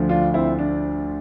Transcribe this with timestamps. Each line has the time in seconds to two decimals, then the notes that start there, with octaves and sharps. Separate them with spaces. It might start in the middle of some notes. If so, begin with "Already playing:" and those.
Already playing: D2 D3 F3
0.09 D4 F4
0.34 C4 E4
0.59 D4